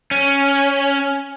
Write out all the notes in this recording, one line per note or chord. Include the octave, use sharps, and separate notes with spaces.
C#4